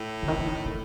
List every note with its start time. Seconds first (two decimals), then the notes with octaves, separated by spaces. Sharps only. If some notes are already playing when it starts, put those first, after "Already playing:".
Already playing: A2
0.23 D3
0.28 D#3
0.38 F3
0.46 D#3
0.65 D#3